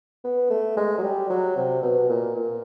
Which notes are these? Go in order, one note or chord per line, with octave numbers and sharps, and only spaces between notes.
B3
A3
G#3
F#3
G3
F#3
C3
B2
A#2
A#2